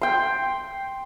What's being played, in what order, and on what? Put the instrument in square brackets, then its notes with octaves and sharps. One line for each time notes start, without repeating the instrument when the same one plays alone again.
[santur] G5 C6